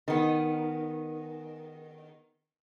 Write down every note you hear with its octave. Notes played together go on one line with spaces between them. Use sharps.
D#3 B3